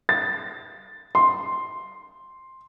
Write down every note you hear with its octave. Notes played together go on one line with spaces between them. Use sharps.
A6
C6